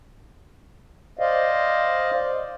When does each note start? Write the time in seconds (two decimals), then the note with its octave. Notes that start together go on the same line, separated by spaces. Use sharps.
1.19 C5 D5 D#5 F5